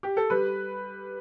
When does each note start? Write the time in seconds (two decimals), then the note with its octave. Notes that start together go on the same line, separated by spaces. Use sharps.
0.03 G4
0.17 A4
0.30 G3 B4